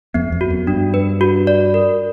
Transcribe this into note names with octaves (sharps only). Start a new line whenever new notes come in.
F2 B3
F2
F#4
F#2
G2 D4
B4
F#4
D5
A#4